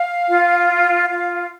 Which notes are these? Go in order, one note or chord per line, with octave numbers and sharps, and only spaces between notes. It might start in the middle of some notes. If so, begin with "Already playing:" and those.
Already playing: F5
F4
F5
F4